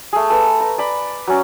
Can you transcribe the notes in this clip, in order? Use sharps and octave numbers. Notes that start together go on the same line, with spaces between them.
A3 G#4
A4 B4
A#5
D5 B5
F#3 C#4